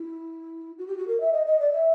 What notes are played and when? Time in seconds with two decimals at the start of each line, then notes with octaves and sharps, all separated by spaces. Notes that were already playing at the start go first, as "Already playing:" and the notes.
Already playing: E4
0.78 F#4
0.87 G4
0.98 F#4
1.07 A#4
1.20 E5
1.33 D#5
1.46 D#5
1.60 D5
1.73 E5